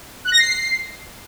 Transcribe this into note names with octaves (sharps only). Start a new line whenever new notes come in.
F#6
A#6
C7